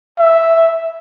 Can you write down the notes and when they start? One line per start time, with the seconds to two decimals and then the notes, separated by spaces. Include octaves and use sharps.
0.19 E5